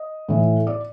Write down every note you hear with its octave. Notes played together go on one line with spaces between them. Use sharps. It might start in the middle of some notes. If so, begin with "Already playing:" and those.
Already playing: D#5
A2 E3
D5